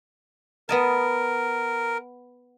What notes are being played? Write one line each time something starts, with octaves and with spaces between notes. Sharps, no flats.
B3 A#4 D#5 A5